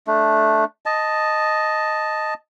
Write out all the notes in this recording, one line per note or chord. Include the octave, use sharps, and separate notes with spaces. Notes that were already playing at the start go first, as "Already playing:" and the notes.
A3 D4
D#5 A5